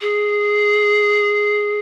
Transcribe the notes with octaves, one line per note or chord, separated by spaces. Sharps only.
G#4